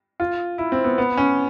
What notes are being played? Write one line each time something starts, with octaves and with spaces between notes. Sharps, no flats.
F4
E4
C4
B3
B3
C#4